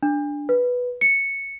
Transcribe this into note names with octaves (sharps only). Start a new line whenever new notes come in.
D4
B4
C#7